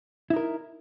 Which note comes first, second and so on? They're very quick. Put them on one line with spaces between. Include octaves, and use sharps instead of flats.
E4 D#4 A#4